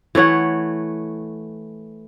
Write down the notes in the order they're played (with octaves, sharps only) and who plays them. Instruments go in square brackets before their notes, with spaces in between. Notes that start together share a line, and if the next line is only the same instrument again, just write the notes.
[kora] E3 A3 C#5 F#5